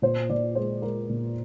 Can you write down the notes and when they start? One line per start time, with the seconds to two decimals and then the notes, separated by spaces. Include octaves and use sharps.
0.02 A#2 C5
0.30 A#2 D5
0.55 G#3 C5
0.82 G#3 A#4
1.09 A#2